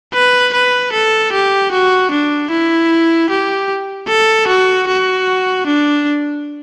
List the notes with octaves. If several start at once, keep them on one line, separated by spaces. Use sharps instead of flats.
B4
B4
A4
G4
F#4
D4
E4
G4
A4
F#4
F#4
D4